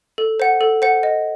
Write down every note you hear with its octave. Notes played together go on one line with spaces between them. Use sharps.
A4
C5 F#5
A4
C5 F#5
D#5